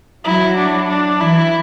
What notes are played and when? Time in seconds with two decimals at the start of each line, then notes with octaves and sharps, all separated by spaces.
0.24 F#3 E4
0.57 D4
0.88 D4
1.20 E3 E4